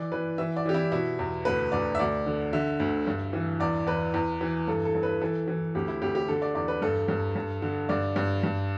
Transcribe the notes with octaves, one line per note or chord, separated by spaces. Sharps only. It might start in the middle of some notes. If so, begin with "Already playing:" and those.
Already playing: E3 D5
E3 B4
E3 E5
D5
E3 G4
E4
B2 E4
E2
D2 B4
D2 D5
E5
D2 D5
D3
D3 E5
D2
G2
E3
E2 D5
E2 B4
E2
E3
G2 A4
A4
G2
B4
E3 A4
E3
D2 G4
E4
D2 G4
G4
D3 A4
D5
E2 D5
B4
G2 A4
G2
G2
D3
G2 D5
G2
G2